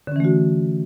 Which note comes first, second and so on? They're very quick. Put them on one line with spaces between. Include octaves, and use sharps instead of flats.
D3 C#4 E3 A3 F#4